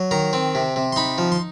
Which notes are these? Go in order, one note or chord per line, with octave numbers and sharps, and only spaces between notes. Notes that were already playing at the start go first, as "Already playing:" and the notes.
Already playing: F#3
D#3 A#5
C4
C3
C3
C6
D#4 B5
F3
C6